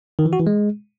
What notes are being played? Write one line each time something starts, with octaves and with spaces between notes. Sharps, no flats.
D#3
E3
F#4
E3
G#3